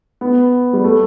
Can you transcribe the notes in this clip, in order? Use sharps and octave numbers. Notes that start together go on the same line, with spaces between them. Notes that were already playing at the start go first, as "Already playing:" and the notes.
B3
G3
A3